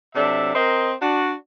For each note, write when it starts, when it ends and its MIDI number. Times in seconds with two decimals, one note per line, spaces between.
0.15 0.53 48
0.15 0.53 54
0.15 0.53 62
0.15 0.53 69
0.15 0.53 76
0.55 0.94 60
0.55 0.94 70
0.55 0.94 72
0.55 0.94 75
1.02 1.33 62
1.02 1.33 66